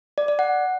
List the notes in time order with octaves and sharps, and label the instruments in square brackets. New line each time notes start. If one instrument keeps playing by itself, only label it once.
[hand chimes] D5
D5
F#5